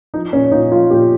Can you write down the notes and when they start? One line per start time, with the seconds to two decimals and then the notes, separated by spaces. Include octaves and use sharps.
0.14 F3 D#4
0.33 A#2 C#4
0.52 A#2 D#4
0.72 F3 F4
0.90 A#2 G4